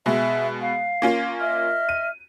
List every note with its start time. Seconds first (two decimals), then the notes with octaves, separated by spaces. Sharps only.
0.06 B2 G#3 E5
0.60 F5
1.02 A#3 C#4 F4
1.40 D#5 E5 F6
1.89 D#7